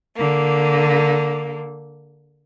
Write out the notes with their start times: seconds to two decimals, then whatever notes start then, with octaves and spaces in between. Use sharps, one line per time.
0.17 D3 A#3